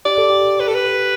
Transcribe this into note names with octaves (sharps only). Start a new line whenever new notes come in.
G4 D5
A4
G4
B4
A4
B4